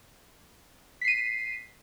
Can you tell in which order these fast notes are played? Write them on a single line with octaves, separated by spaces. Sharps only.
B6 C7 D#7